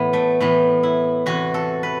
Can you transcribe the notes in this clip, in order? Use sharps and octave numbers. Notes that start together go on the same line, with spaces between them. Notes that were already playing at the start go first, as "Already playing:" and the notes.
Already playing: A2 E3 B3
A3
A2 E3 B3
E4
E2 C3 E3 F#4
A4
B4